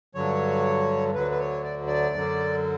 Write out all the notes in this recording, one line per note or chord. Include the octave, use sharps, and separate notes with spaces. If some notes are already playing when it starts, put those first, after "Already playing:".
G2 D3 F#3 C#5
D2 D3 F#3 B4
B4
C#5
D5
D5
F#2 D3 F#3